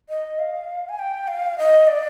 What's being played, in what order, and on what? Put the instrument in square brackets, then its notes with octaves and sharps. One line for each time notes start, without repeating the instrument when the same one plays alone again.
[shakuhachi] D#5
F5
G#5
G5
F5
D#5
D5